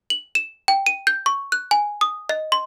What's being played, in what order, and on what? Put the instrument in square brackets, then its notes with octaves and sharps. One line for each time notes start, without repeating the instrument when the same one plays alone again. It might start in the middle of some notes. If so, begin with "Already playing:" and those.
[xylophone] F#7
E7
G5
D#7
G6
C#6
F#6
G#5
D#6
D#5
C6